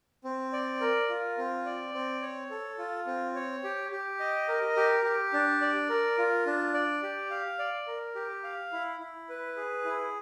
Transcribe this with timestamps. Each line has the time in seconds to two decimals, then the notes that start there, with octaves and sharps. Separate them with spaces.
0.24 C4
0.53 D5
0.81 A#4
1.09 F4
1.38 C4
1.66 D5
1.94 C4
2.22 C#5
2.51 A4
2.78 F4
3.07 C4
3.35 C#5
3.64 G4
3.92 G4
4.20 D#5
4.48 A#4
4.76 G4
5.04 G4
5.33 D4
5.61 D5
5.89 A#4
6.18 F4
6.46 D4
6.74 D5
7.03 G4
7.30 F5
7.59 D5
7.87 A#4
8.15 G4
8.44 F5
8.72 E4
9.00 E4
9.29 B4
9.57 G#4
9.85 E4